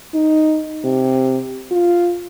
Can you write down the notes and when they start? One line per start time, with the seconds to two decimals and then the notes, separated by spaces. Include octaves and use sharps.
0.14 D#4
0.84 C3
1.71 F4